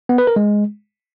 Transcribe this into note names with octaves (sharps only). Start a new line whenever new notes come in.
B3
B4
A#4
G#3